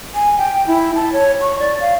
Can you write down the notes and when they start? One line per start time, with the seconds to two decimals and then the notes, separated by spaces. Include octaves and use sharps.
0.15 G#5
0.38 G5
0.67 E4
0.95 A5
1.13 C#5
1.41 C#6
1.59 D5
1.81 F5